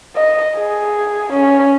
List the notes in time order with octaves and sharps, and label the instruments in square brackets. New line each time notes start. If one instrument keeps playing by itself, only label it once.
[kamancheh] D#5
G#4
C#4